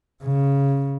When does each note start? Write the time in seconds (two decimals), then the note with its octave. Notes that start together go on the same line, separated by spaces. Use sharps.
0.23 C#3